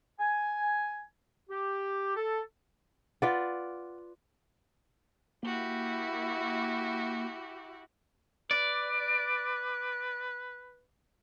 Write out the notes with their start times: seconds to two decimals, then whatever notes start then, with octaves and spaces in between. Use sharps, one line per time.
0.20 G#5
1.50 G4
2.16 A4
3.22 F4 B4 D5 F#5
5.43 A#3 E4 F#4 G4
8.51 B4 D5